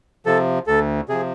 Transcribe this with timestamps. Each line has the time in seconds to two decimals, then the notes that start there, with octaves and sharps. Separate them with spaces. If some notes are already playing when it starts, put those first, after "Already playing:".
0.26 C3 F3 A4
0.67 D2 A4
1.09 C3 F3 G#4